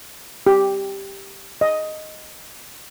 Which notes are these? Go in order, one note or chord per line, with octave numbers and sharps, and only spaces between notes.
G4
D#5